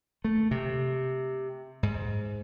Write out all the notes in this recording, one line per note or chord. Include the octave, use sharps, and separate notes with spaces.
A3
C3
G#2